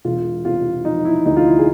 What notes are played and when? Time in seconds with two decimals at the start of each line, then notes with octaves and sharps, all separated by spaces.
0.05 E1 F4
0.45 C3 F4
0.85 F3 D#4
1.05 E4
1.26 D2 D#4
1.37 F4
1.46 E4
1.58 G#4